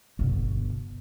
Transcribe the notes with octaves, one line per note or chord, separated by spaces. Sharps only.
G1 B2